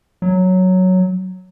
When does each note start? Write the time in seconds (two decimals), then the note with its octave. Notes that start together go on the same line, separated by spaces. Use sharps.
0.22 F#3